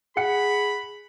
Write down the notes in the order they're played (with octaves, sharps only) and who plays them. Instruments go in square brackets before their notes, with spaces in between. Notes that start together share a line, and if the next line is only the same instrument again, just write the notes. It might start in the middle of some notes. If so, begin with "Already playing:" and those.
[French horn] G#4 [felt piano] F#5 C#7 [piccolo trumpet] B5